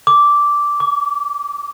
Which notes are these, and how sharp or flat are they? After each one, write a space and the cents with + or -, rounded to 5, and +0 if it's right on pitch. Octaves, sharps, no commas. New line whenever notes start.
D6 -10
D6 -40